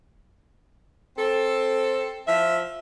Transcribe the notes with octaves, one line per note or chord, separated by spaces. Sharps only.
C4 A4
F3 E5